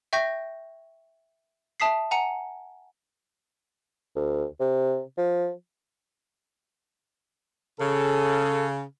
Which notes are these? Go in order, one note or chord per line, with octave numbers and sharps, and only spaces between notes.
E5 G5 C#6 G6 A#6
E5 A5 D#6 B6 C7
F#5 G#5 A#5 C#7
D2
C3
F3
C#3 A4